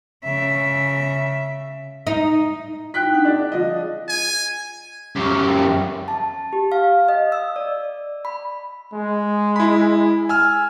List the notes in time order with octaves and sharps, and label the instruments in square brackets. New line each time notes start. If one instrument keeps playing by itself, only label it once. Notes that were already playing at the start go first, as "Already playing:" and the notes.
[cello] C#3 E5
[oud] D#4
[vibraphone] D#4 E4 [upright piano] G5 F#6 B6
[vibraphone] C4 D4 F#5
[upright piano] D4 [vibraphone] G#4
[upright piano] F3 D#5
[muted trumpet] G#5
[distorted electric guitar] F#2 G4
[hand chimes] A5
G4
F5
D#5
E6
D5
B5
[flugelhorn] G#3
[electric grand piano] E4 B5
G#5 E6 F6